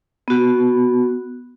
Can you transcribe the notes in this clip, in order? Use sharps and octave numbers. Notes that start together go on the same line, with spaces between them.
B3 F#4